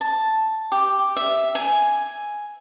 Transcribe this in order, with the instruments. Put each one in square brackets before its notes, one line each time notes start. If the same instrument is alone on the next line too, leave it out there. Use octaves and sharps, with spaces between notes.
[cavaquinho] A5
G4
E5
G#5